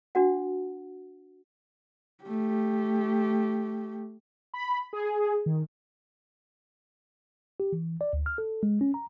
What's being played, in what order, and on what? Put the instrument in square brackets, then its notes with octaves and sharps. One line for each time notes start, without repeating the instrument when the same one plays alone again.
[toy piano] D4 F#4 F#5
[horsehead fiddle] A3 G4
[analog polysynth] B5
G#4
D#3
[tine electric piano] G4
E3
D5
D2
F6
A4
G#3
C#4
A#5